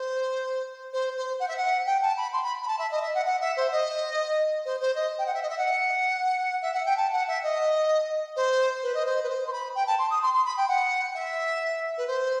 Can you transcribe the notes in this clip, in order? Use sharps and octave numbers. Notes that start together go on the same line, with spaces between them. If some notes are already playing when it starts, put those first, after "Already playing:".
Already playing: C5
C5
C5
F#5
E5
F#5
G5
A5
B5
C6
B5
B5
A5
E5
D#5
E5
F#5
F#5
E5
C5
D#5
C5
C5
D#5
G5
F#5
E5
D#5
E5
F#5
E5
F#5
G5
A5
F#5
E5
D#5
C5
B4
D#5
C5
B4
C5
C6
B5
G5
A5
C6
D#6
C6
C6
B5
G5
F#5
E5
B4
C5